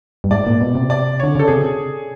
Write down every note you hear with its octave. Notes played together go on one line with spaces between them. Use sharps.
G2
G#2 D5
A#2
B2
C3
D5
D3 C#5
C#3 A4
C3 G#4